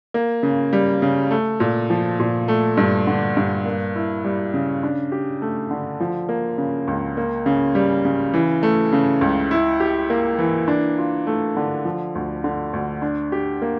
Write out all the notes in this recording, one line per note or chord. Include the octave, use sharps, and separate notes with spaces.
A#3
C#3
G3
C#3
A3
A#2
F3
A#2
A3
G2
D3
G2
A#3
E4
G3
C#3
D4
G4
A3
D3
F3
A#3
C#3
C#2
A#3
C#3
G3
C#3
E3
A3
C#3
C#2
E4
G4
A#3
E3
D4
F4
A3
D3
F3
D2
D3
D2
D4
G4
A#3